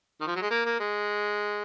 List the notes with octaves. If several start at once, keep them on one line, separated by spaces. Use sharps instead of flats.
D#3
F3
F#3
G#3
A#3
A#3
G#3